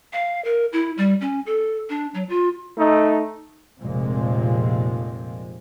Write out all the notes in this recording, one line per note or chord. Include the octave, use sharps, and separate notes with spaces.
F5
A#4
E4
G3
C#4
A4
D4
F#3
F4
A3 D#4
F1 A#2 F3 G#3 C4